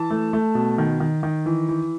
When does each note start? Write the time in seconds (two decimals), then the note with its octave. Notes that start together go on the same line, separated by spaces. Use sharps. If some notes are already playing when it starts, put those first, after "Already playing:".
Already playing: E3 A5
0.10 A3
0.33 A3
0.55 B2
0.78 D#3
1.00 D#3
1.23 D#3
1.46 E3
1.69 E3